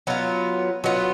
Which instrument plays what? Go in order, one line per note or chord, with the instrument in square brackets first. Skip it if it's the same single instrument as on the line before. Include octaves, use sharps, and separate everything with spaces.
[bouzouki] F#3 B3 F4
F#3 B3 F4